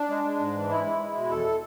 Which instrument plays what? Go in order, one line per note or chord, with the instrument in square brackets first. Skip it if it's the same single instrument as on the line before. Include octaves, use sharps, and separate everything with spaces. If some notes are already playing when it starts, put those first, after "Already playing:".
Already playing: [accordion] D4
G#3
G#3
G#2
E3
G#3 E4
G#3
G#3
B2
E2 A4